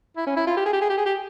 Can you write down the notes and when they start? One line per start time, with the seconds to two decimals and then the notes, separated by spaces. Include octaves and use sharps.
0.17 E4
0.27 C#4
0.37 E4
0.47 F4
0.57 G4
0.66 G#4
0.73 G4
0.81 G#4
0.90 G4
0.98 G#4
1.06 G4